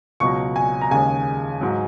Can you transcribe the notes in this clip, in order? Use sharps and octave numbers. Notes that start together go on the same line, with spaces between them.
C#2 B2 F#3 C#6
G#5
A#5
D#2 C#3 G#3 G#5
G#2 F#3